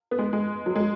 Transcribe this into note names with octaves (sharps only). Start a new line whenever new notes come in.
B3
G#3
G#3
F#3
G#3